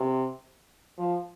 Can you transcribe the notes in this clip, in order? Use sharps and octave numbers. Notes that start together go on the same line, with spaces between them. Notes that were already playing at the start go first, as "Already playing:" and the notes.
Already playing: C3
F3